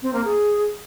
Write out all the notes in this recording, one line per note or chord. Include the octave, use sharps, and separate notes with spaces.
C4
A#3
G#4